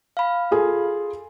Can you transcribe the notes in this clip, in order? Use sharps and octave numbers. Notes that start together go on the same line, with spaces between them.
F5 B5
F4 G#4 A4